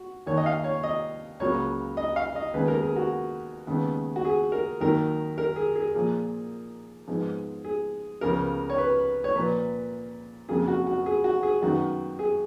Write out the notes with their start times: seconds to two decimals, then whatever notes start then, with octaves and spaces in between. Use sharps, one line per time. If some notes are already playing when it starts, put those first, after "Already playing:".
Already playing: F#4
0.26 D#2 D#3 A#3 C#5
0.37 D#5
0.46 F5
0.64 C#5
0.83 D#5
1.40 C#2 C#3 F#3 A#3 C#5
1.97 D#5
2.16 F5
2.35 D#5
2.54 D#2 C#3 G#3 B3 B4
2.68 A#4
2.82 G#4
2.96 F#4
3.67 D#2 C#3 G#3 B3
4.16 F#4
4.25 G#4
4.52 A#4
4.81 D#2 D#3 F#3 A#3 A#4
5.38 A#4
5.56 G#4
5.76 G#4
5.94 A#2 F3 A#3 G#4
7.08 G#2 F3 G#3 B3
7.64 G#4
8.21 C#2 C#3 F3 B3 A#4
8.70 C#5
8.78 B4
9.24 C#5
9.35 A#2 F3 A#3 B4
10.49 F2 C#3 F#3 A#3 G#4
10.68 F#4
10.87 F#4
11.06 G#4
11.24 F#4
11.43 G#4
11.62 F#2 D#3 F#3 B3 F#4
12.19 G#4